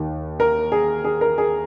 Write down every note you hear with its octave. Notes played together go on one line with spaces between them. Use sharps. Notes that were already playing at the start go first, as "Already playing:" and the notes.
Already playing: D#2 D#3
A#4
G#4
G#4
A#4
G#4